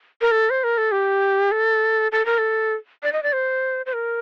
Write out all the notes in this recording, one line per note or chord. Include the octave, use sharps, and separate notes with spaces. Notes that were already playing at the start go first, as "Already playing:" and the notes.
A#4
A4
C5
A#4
A4
G4
A4
A4
A#4
A4
D5
D#5
D5
C5
C5
A#4